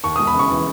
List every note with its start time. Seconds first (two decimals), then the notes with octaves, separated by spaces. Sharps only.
0.04 D#2 C#6
0.16 D#6
0.19 E1
0.27 B5
0.35 C#3 C#6
0.50 E3